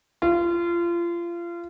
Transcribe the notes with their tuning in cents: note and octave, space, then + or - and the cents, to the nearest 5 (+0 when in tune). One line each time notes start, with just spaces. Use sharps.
F4 -30